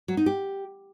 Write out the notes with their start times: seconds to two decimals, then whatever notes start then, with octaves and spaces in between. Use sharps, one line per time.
0.08 F#3
0.17 D#4
0.26 G4